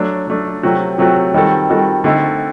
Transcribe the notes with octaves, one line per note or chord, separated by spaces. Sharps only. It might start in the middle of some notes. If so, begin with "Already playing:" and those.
Already playing: F#3 A3 D4
F#3 A3 D4
C3 F#3 A3 C4 F#4
C3 F#3 A3 C4 F#4
D#3 G3 C4 F#4 A4
D#3 G3 C4 F#4 A4
D3 A3 C4 D#4 A4